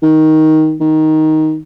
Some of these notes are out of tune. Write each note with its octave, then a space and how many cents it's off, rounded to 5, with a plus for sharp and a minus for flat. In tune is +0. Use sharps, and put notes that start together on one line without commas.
D#3 +10
D#3 +5